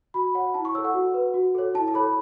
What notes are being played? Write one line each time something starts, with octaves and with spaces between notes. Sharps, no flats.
F#4 B5
C#5 F#5
E4 A5
C#6
A4 C#5 E6
F#5
F#4
B4
F#4
A4 C#5
E4 A5
A5
A4 C#5 B5